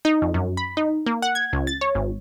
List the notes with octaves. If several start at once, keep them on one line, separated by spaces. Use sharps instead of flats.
D#4
F2
F#2
B5
D#4
A#3
F#5
G#6
C#2
A6
C#5
G#1